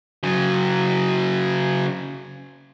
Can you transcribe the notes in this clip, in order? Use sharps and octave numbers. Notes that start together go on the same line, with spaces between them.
C#3 F#3